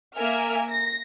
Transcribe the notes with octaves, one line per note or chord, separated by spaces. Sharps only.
A#3 A#4 E5 G#5 F6
A#6